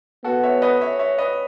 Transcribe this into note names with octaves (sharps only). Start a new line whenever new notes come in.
B3 F#4 A4
C#5 E5
B4 D#5
C#5 E5
C#5 E5
B4 D#5